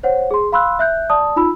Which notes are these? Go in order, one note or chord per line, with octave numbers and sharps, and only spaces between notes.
C5 C#5 F#5
G#4 C6
F5 B5 C6 E6 F#6
E5 F#6 G6
D5 A5 D#6
D#4 F4 B5 E6